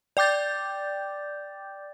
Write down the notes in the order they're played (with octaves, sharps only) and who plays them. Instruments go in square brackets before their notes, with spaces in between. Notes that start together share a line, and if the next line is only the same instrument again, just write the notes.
[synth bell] D5 G5 D6 G6 A6